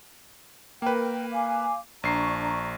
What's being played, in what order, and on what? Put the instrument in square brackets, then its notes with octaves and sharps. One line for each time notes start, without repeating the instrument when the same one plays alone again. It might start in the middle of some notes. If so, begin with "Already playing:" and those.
[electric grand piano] A#3 B4 [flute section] A#4 G5
[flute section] F5 G#5 D6
[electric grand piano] A#1 C7 [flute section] D4 A#5 C#6